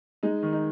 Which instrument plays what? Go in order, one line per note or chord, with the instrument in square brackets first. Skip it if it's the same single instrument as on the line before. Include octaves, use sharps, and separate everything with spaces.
[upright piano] G#3 D#4
D#3
D#4